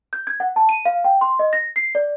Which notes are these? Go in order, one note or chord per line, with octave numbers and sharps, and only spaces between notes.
G6
G#6
F#5
A5
D#7
F5
G5
C6
D#5
A#6
C7
D5